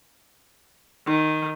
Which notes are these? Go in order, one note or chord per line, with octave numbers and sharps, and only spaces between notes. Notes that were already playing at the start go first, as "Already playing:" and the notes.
D#3 D#4